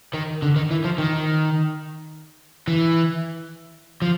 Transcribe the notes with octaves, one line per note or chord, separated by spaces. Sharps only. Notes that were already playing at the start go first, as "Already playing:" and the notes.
D#3
D3
D#3
E3
F3
D#3
E3
F3